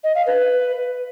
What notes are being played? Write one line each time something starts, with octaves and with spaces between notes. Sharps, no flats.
D#5
F5
B4